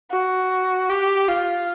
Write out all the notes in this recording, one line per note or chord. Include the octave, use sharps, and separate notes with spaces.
F#4
G4
F4